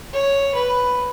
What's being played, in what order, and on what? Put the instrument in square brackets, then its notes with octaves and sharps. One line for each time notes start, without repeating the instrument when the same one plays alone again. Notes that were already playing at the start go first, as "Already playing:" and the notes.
[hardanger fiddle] C#5
B4